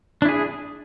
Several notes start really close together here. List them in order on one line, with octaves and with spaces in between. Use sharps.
D4 E4 G#4